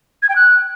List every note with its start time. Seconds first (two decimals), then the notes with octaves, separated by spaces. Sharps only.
0.22 G#6
0.29 G5
0.36 F#6